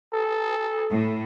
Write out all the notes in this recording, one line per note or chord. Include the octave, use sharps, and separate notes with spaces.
A4
A2